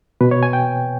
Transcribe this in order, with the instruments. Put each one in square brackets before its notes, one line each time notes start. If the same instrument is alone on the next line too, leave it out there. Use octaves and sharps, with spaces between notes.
[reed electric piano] B2 B4
C#5
G#5
G5